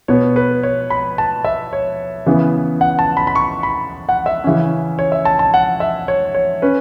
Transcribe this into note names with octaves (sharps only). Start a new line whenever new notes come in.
B2 B3 C#5
B4
C#5
B5
A5
E5
C#5
C#3 E3 B3
F#5
A5
B5
B5
C#6
B5
F#5
E5
C#3 E3 C#4
C#5
E5
A5
A5
F#5
E5
C#5
C#5
C#4 B4